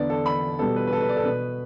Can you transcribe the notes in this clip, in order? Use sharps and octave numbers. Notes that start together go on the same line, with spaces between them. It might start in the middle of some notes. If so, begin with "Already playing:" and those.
Already playing: E2 D3 B3 D5
A4
B5
B2 G3 B3 A4
B4
B4
A4
B4
D5
A4
B2 B3 B4